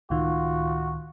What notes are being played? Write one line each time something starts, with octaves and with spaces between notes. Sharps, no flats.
C#2 A2 D#3 F4 F#4